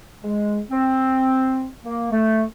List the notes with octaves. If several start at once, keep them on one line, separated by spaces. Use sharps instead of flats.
G#3
C4
A#3
A3